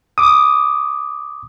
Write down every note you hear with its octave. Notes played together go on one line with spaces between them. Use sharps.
D6 D#6